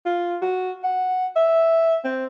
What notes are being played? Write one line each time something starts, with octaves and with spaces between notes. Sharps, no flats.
F4
F#4
F#5
E5
C4